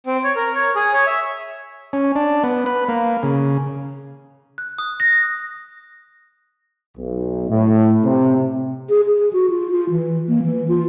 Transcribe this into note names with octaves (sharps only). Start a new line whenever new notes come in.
C4
C#5
A#4
C#5
G#4
C#5
E5
C#4
D4
B3
B4
A#3
C#3
F#6
D#6
A#6
B1
A2
C3
G#4
G#4
F#4
F4
F4
E3
A#3
E3
F4